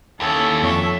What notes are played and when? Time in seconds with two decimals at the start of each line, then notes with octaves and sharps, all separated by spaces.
0.20 D#2 C#4 E4 A4
0.62 F2 C#5 E5 C#6